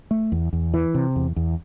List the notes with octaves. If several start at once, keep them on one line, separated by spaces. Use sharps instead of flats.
A3
E2
E2
E3
C3
E2
E2